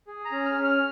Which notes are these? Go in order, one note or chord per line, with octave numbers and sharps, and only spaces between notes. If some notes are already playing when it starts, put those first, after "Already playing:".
G#4
A#5
C#4
F6
C#4
F6